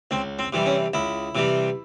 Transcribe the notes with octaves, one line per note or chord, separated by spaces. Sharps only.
C#2 C4
C4
C3 E3 G3
C#4
C#2 E4
C3 E3 G3